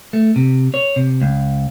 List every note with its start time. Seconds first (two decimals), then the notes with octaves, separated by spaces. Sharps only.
0.13 A3
0.36 C3
0.74 C#5
0.96 C3
1.21 C#2